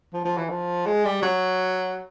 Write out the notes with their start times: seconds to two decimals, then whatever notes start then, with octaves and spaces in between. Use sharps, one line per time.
0.13 F3
0.25 F3
0.37 E3
0.50 F3
0.86 G#3
1.05 G3
1.22 F#3